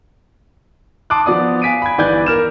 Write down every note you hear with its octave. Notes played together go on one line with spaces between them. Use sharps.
A5 C6 D6 D#6 F#6
F3 B3 D5 D#6
F5 G#5 B6 D7 D#7
B5 G#6
G1 E3 B4 D5 G6 G#6
A#4 F6 E7